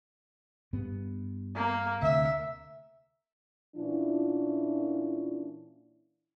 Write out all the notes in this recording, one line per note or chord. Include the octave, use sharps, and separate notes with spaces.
G2 B3
A#3
D2 C3 E5
A#2 E3 C#4 D4 E4 F4